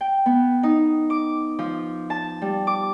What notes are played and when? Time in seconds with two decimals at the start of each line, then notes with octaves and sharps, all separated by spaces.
0.01 G5
0.26 B3
0.63 D#4
1.10 D6
1.59 F3
2.10 A5
2.42 G3
2.67 D6